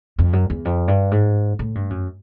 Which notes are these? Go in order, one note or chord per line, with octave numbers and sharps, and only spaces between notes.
F2
F#2
E2
F2
G2
G#2
A2
G2
F#2